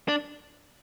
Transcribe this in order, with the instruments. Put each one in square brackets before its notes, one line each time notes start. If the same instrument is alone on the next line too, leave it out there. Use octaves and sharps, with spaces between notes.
[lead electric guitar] D4